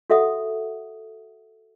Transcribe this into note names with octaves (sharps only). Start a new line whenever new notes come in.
F#4 A4 E5 F#5 D#6